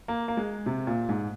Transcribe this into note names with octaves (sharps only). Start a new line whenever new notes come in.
A#3
A#3
G#3
C3
A#2
G#2